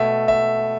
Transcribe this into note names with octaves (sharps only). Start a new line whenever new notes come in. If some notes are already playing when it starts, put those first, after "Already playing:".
Already playing: B2 A3 E5
E5